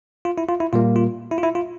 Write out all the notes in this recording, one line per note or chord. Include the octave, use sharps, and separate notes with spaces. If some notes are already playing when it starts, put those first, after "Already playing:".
F4
E4
F4
E4
A#2 G3 A#3 F4
F4
E4
F4
E4
F4